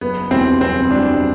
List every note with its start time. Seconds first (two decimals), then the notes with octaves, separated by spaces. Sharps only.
0.01 F#1 B3
0.31 E2 B2 G3 C4
0.60 F#1 C4
0.90 E2 B2 G3 D4